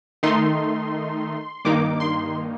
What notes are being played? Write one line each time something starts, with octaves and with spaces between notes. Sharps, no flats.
D#3 A3 D#4 C6
G2 D#3 A#3 D#4 D6
C6